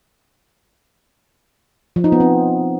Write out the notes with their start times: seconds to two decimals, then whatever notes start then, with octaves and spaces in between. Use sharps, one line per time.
1.96 F3
2.04 D#4
2.12 B3
2.20 C4